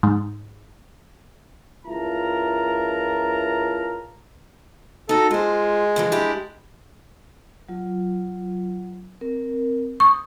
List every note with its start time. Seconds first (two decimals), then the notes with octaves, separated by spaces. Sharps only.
0.03 G#2
1.86 C#2 E4 F4 A#4 A5 A#5
5.09 D#4 F#4 A4
5.31 G#3 F4 C5
5.96 D3 E3 F3
6.12 D4 E4 G4
7.69 F#3 F4
9.21 C4 A#4
10.00 C#6 D#6